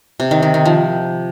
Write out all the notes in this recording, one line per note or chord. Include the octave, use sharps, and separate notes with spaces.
C3
D#3
D#3
D#3
F3